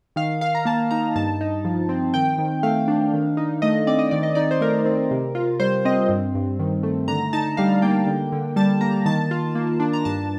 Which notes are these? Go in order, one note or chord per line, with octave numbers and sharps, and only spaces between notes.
D#3 F5
D#3 F5
A#5
A#3 A5
D#4 A#5
G2 A5
D#4
F3
C4
D#3 G5
D#3
A3 F5
D4
D#3
D#4
A3 D#5
C4 D5
D#5
D#3 D5
D#5
D#4 D5
C5
A3 A#4
C4
C3
F4
G3 C5
C4 D#5
G2
G2
D#3
A3
D3 A#5
D#4 A5
G3 F5
A#3 G5
D3
D3
G3 A5
A#3 A#5
D#3 A5
F4
A#3
D4
A#5
G2 A5